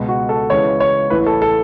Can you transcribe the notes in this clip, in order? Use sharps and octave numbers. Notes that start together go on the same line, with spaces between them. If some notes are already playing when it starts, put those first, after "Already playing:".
Already playing: C#2 B2
F#4
A4
C#2 C#3 E3 C#5
C#5
A1 A2 E3 B4
A4
A4